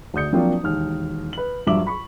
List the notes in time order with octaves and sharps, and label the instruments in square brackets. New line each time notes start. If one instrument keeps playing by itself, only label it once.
[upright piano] D2 D5 D#6 G6 C#7
F3 F#3 A#3 C4 D4 F4
E1 D#2 F6
B4 F#7
A#1 G2 F#3 E5 D6 F#7
B5 C#6